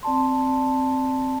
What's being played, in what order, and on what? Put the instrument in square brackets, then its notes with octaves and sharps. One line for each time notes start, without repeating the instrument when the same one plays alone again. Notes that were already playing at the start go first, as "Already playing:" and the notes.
[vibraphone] C4 D5 A5 C6